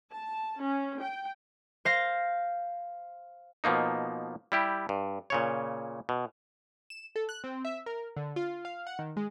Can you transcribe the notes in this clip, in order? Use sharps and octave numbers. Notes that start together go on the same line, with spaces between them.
A5
C#4
G5
C5 F5 A#6
B2 F3 A#3 D#4
G3 E4 G4
G2
A#2 C#3 C#5
B2
E7
A4
F#6
C4
E5
A#4
D3
F4
F5
F#5
D#3
G#3